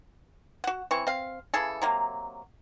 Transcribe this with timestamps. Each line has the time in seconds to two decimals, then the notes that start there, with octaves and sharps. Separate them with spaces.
0.64 F#4 F#5
0.91 E3 C4 C#6
1.07 C4 F5
1.54 C#3 E3 G#4 A4
1.82 C3 F#3 A#3